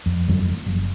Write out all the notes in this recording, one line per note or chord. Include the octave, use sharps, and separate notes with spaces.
F2
G1 F2 F3 F#3
F#1